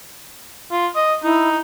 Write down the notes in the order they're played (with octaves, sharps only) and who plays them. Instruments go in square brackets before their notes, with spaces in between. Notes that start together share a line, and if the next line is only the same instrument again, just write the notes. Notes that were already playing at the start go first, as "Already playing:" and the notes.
[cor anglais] F4
D#5
[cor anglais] D#4 [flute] E4